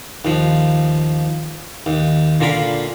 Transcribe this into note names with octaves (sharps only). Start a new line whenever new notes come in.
D#2 F3
D#2
A#2 D3 F4 A#4 B5